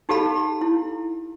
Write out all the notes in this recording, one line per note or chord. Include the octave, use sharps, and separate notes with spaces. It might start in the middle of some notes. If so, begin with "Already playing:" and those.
D#4 G4 A4 F5 B5
E4